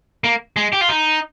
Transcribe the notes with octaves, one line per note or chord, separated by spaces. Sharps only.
A#3
G#3
G4
F4
D#4